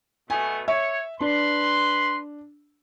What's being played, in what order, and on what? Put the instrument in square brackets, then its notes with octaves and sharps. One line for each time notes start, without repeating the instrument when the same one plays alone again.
[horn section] B2 A3 B3 [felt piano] G#5
[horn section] C#5 [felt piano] E5
[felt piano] D4 [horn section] B4 C6